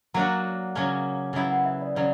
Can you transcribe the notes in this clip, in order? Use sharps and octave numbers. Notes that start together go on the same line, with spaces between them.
F#3 A#3 D4 F#4 A#5
C#3 F#3 A#3 C#4
C#3 F#3 B3 E4
F#5
E5
D5
C#3 F#3 D5